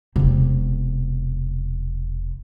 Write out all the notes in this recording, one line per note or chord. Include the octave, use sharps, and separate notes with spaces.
E1 C3